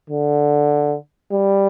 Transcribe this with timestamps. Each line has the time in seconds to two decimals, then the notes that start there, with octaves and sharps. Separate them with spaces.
0.10 D3
1.32 G3